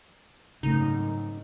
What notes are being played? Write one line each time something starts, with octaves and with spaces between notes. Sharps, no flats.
G#1 F#2 C#3 A3 D#4